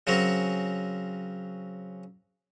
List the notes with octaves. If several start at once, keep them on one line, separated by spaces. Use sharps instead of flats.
C#3 F#3 C4 C#4 A#4